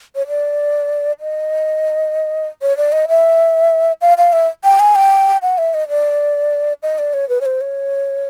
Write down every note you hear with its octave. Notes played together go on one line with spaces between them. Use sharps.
C#5
D5
D#5
C#5
D5
D#5
E5
F5
F5
E5
G5
G#5
G5
F#5
E5
D#5
D5
D#5
D5
C#5
B4
C#5
C5
C#5